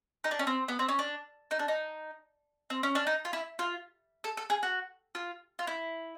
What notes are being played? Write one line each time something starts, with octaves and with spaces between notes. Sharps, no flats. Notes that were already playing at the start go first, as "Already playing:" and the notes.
D#4
D4
C#4
C4
B3
C4
C#4
D4
D#4
D4
D#4
C4
C#4
D4
D#4
F4
E4
F4
A4
A4
G#4
F#4
F4
F4
E4